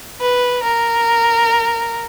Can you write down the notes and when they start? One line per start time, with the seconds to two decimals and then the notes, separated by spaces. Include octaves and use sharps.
0.21 B4
0.63 A#4